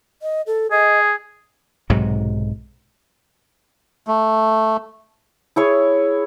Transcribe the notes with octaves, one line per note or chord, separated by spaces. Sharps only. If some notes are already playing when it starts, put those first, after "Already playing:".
D#5
A4
G#4 D#5
B1 G#2 C3 F#3
A3
E4 G#4 C#5